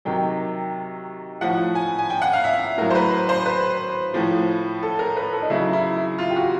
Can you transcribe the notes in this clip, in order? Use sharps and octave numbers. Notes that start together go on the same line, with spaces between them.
C3 D#3 F#3 G5
A2 F3 F#5
G#5
G#5
G5
F#5
F5
E5
A2 F#3 A#4
C5
B4
C5
B4
A2 F3
A4
A#4
B4
A4
D#4
C#3 F#3 E4
E4
E4
F4
G4
F#4